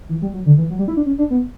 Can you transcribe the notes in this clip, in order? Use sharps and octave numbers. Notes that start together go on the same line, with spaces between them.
E3
G3
F#3
D3
E3
F#3
G3
E4
D4
C#4
D4
B3